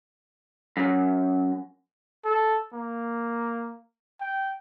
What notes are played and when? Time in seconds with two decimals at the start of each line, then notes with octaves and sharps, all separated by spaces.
0.77 F#2
2.25 A4
2.73 A#3
4.21 G5